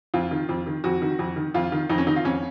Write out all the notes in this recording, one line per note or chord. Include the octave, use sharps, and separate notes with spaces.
F2 F4
D#3
F2
D#3
F2 F#4
D#3
F2
D#3
F2 F4
D#3
F2 D#4
C#4
D#3 D#4
F4
F2 C#4